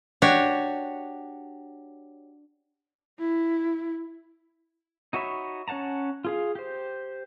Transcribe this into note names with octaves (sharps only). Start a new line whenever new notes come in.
D4 F#4 G4 C#5
E4
D#4 F#4 C#5 E5 B5
C#4 C#5 F#5 A5 A#5
F4 G#4 F5
G4 C5